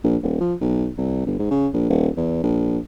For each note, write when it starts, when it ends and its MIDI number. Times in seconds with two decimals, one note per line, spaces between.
0.04 0.16 34
0.23 0.39 27
0.41 0.54 53
0.61 0.88 35
0.97 1.25 36
1.27 1.38 31
1.39 1.49 44
1.51 1.68 49
1.74 1.85 34
1.89 2.08 27
2.17 2.41 40
2.43 2.78 34